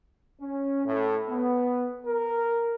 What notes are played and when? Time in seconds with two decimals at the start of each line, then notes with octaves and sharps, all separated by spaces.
0.40 C#4
0.86 A2
1.28 B3
2.06 A#4